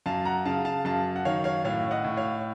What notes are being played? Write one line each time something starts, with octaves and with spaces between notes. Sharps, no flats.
F#2 F5 A5
F#5 A#5
C#3 F5 A5
F5 A5
F#2 F5 A5
F#5
D#3 C#5 F5
C#5 F5
A2 C#5 F5
D#5 F#5
A2
C#5 F5